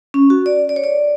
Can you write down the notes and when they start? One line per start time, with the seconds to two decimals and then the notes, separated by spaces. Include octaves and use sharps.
0.14 C#4
0.30 F#4
0.46 D5
0.69 D5
0.76 C#5
0.84 D5